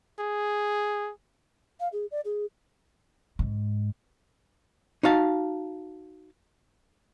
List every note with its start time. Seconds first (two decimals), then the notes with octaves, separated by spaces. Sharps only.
0.19 G#4
1.80 F5
1.92 G#4
2.11 D5
2.25 G#4
3.39 G#2
5.03 D#4 F#4 F5 A5